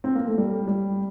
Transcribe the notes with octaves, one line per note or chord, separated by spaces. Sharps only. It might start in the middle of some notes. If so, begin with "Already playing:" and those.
C4
A#3
A3
G3
G3